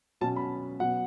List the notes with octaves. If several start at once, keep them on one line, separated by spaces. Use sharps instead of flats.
B2 F#3 C#4 A5
B5
B2 F#3 B3 F#5